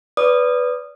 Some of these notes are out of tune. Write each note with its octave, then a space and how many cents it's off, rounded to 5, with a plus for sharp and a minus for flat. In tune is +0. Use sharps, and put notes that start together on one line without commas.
B4 +0 D5 -25 D#6 -15